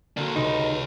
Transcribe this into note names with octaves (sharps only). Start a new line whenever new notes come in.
D3 A#3 C4 D4 F#4
C#2 C3 D#4 G#4 B4